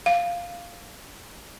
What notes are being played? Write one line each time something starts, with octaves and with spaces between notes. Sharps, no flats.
F5